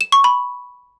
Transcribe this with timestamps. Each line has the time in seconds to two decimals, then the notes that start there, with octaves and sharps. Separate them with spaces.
0.01 E7
0.12 C#6
0.24 B5